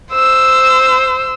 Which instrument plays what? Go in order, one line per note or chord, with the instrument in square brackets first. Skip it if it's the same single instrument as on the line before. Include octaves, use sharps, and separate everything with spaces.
[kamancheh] C5 E6